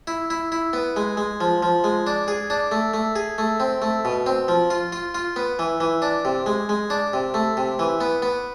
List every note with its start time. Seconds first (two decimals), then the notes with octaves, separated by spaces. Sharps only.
0.07 E4
0.30 E4
0.52 E4
0.73 B3
0.96 G#3
1.17 G#3
1.41 F3
1.63 F3
1.84 G#3
2.07 D4
2.28 G#4
2.50 D4
2.72 A3
2.94 A3
3.16 G#4
3.38 A3
3.60 C4
3.82 A3
4.05 B2
4.26 C4
4.48 F3
4.70 F4
4.92 F4
5.15 F4
5.36 B3
5.59 E3
5.80 E3
6.02 D4
6.25 C3
6.46 G#3
6.69 G#3
6.90 D4
7.13 C3
7.34 A3
7.57 C3
7.79 E3
8.01 B3
8.22 B3